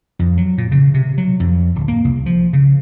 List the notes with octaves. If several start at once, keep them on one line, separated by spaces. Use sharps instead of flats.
F2
F#3
A#2
C#3
C3
F#3
F2
D1
A#3
C2
F3
C#3